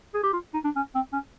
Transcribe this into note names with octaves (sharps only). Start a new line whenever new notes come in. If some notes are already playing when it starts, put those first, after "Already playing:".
G#4
G4
F4
D#4
D4
C#4
C4
C#4